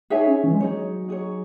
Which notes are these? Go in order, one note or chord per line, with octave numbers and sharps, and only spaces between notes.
D#4 G#4 C#5 E5 G#5
C#4
E3
G#3
F#3 D#4 G#4 C#5
D#4 G#4 C#5